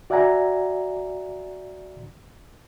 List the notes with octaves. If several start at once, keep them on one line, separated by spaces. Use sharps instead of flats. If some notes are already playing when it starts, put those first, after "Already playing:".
F#4 D5 E5 F#5 G#5 A#5